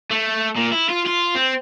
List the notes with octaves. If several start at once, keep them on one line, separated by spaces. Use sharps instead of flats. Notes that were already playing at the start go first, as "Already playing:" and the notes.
A3
A#2
E4
F4
F4
C4